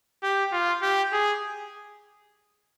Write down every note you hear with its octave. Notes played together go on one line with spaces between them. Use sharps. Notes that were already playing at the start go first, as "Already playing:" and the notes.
G4
F4
G4
G#4